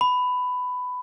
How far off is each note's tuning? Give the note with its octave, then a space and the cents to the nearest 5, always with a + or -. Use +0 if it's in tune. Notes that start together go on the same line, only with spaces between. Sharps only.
B5 +15